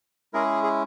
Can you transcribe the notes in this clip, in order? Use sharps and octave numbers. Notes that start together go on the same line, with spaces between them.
G#3 C#4 E4 G#4 A#4
G#4